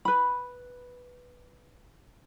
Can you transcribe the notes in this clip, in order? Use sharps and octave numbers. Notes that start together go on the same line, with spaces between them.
B4 B5